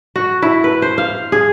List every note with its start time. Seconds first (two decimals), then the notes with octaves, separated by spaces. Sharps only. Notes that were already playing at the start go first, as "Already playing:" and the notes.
0.16 F#4
0.42 E4
0.64 B4
0.82 C5
0.98 F5
1.32 G#4